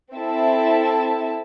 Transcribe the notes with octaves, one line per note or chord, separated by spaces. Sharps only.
C4 E4 A4 E5 A5